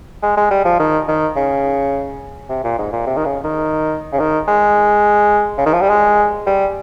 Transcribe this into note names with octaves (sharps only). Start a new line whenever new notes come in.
G#3
G#3
G3
F3
D#3
D#3
C#3
C3
A#2
G#2
A#2
C3
D#3
C#3
D#3
C#3
D#3
G#3
C#3
D#3
F3
G3
G#3
G3